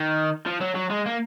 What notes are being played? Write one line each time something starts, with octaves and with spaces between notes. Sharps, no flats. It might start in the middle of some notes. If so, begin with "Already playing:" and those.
Already playing: D#3
F3
F#3
F#3
G#3
A#3